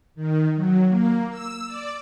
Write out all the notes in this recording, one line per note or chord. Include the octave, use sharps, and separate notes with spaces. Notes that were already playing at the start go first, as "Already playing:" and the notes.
D#3
F#3
A#3
E6
D5